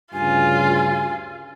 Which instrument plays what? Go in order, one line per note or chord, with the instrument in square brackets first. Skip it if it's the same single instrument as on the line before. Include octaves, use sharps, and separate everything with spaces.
[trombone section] D2 G2 C#3 [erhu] F4 [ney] G#5